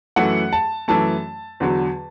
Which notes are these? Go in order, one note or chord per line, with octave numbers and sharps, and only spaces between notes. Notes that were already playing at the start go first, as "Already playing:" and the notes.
F#2 E3 A3 F#5
A5
F#2 E3 A3 A5
E2 D3 F#3